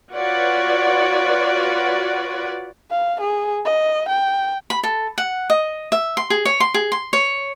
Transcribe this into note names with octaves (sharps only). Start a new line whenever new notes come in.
F4 F#4 B4 C#5 D5 F#5
F5
G#4
D#5
G5
B5
A4
F#5
D#5
E5
C6
G#4
C#5
C6
G#4
C6
C#5